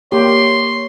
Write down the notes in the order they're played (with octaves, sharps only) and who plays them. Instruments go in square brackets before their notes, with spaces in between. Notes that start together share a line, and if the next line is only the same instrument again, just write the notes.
[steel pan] A#3 G4 [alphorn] C#5 [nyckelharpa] C6